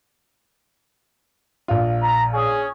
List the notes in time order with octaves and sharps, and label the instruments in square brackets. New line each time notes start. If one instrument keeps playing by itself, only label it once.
[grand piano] A#1 F4
[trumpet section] A#5
C#4 G#4